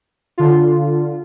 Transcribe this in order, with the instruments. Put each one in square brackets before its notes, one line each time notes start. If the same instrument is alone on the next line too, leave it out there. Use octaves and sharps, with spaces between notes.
[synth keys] D3 F4